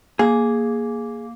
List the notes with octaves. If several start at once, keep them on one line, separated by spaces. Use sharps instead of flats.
A#3 G#4